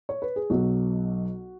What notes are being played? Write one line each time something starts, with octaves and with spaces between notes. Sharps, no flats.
C#5
B4
G#4
B1 B2 F#3 F#4